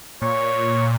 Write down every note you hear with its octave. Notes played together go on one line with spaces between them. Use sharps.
A#2 C#5